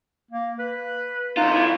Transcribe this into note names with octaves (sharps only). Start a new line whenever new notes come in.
A#3
B4
F#2 D#4 F4
E4